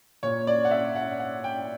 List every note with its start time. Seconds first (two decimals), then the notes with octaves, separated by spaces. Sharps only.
0.23 A#2 C#5
0.47 D5
0.65 F#5
0.71 E5
0.95 F#5
1.20 F#5
1.44 G5